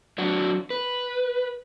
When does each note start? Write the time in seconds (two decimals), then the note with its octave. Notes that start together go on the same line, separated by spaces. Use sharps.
0.18 F#3 D4 F#4
0.70 B4